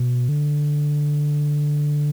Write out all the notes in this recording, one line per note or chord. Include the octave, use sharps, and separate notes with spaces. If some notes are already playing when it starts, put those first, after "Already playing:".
Already playing: B2
D3